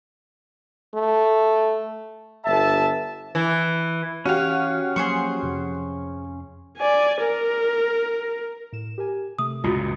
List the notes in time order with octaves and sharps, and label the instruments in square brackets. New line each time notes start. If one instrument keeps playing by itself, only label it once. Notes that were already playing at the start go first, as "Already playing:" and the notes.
[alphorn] A3
[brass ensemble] G1 E5 A5
[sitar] E3
[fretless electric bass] E3 [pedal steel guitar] C#4 F5 [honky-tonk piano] F#4 G4
[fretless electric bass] F3 F#3 A#3 [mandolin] G#4 C5 C#6
[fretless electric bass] F2 C3 F3
[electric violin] D5 G#5
A#4
[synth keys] A2 E7
G4 A#4 G#5
[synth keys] C3 A3 [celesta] D#6
[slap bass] C#2 G2 A#2 [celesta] F4 F#4